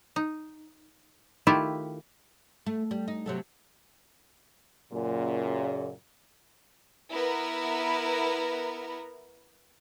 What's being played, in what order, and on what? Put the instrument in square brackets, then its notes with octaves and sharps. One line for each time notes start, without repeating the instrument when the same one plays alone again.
[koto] D#4
D#3 A3 E4 F4 G4
[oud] A3
G3
D#4
C3 F#3 A3
[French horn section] F#2 A#2 C#3
[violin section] B3 E4 A#4 B4 A#5